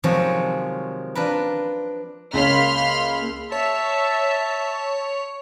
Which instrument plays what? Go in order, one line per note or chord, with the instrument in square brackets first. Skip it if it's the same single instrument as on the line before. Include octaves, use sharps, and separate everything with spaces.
[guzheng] C3 D#3 F3 F#3 G#3 C#5
D4 F4 A#4 B4
[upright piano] C#2 C#5 [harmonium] A#3 [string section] B5 C6 F6
[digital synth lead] C#5 [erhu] E5 [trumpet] A5